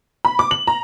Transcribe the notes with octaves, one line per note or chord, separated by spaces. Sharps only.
B5
D6
F#7
A#5